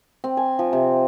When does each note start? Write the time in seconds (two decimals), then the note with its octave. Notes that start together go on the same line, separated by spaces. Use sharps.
0.24 C4
0.37 G#5
0.59 F3
0.73 C3